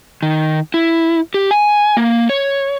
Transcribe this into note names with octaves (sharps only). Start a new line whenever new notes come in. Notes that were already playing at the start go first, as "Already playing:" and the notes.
D#3
E4
G4
G#5
A#3
C#5